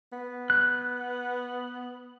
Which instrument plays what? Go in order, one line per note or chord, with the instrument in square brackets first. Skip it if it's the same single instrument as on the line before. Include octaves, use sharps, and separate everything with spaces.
[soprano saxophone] B3
[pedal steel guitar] F#6